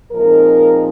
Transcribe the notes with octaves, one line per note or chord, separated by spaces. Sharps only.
A#2 F3 G#3 C4 D#4 A#4